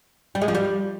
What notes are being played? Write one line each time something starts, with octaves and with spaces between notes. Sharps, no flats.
G3
G#3
F3
G3